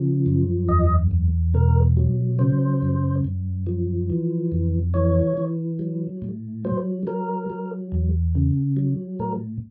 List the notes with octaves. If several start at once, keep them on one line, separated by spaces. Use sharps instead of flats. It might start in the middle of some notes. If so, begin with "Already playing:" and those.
Already playing: C#3 F3
F#2
E2 D#5
E2
B2 A#4
F#3
C#3 C5
F#2
F#2
F3
E3
F2
E3 C#5
E3
F#3
A2
F#3 C5
F#3 A#4
F#3
E2
C#3
F#3
A2 A#4